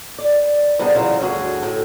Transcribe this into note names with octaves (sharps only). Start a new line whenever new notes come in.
D5
C3 G3 B3 D4 G#4
C#3 E3 F#3 F4
D2 G2 F#4 G#4
A2